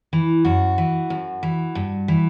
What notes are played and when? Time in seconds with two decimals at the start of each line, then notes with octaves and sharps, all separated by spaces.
0.13 E3
0.45 F#2 F#4
0.78 E3
1.10 F#2
1.43 E3
1.75 G2
2.08 E3